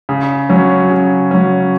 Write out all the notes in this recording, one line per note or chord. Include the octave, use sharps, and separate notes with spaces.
C#3
F#3 C#4
C#3
F#3 C#4